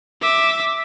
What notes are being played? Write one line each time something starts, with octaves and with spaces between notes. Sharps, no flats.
E5 D6